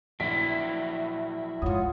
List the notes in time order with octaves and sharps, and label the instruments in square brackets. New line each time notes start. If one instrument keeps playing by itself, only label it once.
[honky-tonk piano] A#1 B6 D7 [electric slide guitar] F#3 E4
[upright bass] F2 G#2 [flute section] F4 C#5 F#5 [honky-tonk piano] D#6